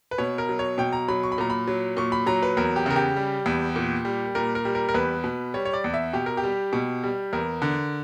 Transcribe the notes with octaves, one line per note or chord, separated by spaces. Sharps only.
B4
B2 C#5
A#4
F#3
C#5
B2 G5
A#5
F#3 B5
C#6
B5
A#2 A#5
B5
F#3
A#2 C#6
B5
F#3 A#5
B4
E2 A#4
G4
C#3 A#4
G4
G3
E2
A#2
G3
A#2 A#4
A#4
G3
A#4
A#4
E2 B4
B2
G3 C#5
C#5
D5
E2
E5
B2 G4
A#4
G4
G3
B2
G3
E2 A#4
D3